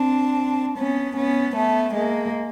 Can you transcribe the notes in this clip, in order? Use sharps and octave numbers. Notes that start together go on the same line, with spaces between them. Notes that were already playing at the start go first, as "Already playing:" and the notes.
Already playing: C4 D4
B3 C#4
B3 C#4
A3 B3
G#3 A#3